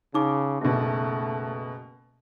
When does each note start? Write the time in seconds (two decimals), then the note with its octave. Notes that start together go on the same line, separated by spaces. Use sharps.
0.14 C#3 D#4 D6
0.61 F#1 B2 A3